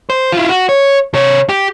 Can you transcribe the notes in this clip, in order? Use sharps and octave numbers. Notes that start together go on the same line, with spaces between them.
C5
E4 F4
F#4
C#5
C3 C#5
G4